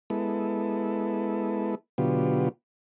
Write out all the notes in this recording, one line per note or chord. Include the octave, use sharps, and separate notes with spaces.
G#3 B3 E4 A4
B2 D3 F#3 B3 F4 G4